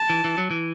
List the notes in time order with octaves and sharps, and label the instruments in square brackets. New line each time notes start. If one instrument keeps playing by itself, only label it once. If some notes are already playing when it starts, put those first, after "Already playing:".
Already playing: [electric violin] A5
[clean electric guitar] E3
E3
F#3
E3